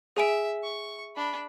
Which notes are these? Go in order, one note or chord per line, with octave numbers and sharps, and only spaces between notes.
G#4 E5 G#5 D7
C#6
D4 B5